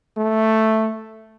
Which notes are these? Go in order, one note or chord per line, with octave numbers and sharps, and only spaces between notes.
A3